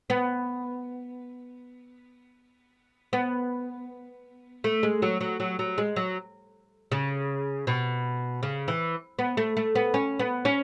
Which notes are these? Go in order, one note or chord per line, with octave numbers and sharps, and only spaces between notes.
B3
B3
A3
G#3
F#3
F#3
F#3
F#3
G#3
F#3
C#3
B2
C#3
E3
B3
A3
A3
B3
C#4
B3
C#4